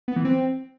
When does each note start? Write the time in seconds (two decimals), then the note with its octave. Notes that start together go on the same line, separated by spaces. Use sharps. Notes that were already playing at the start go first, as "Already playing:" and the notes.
0.08 B3
0.16 E3
0.25 C4